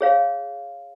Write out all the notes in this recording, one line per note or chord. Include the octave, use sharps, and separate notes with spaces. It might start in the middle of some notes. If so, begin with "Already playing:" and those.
G#4 C#5 F5